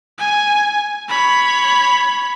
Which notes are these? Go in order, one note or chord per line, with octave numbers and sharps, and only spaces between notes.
G#5
C#5 B5